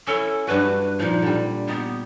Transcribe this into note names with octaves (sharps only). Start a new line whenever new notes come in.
C#4 E4 A4
G2 D4 F#4 B4
A#2 F3 D#4
D3 G3
B3 D#4 G4